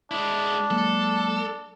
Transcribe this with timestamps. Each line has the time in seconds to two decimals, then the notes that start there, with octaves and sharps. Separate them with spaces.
0.11 G#3 D4 E4
0.71 F#3 G#3 A#3 A4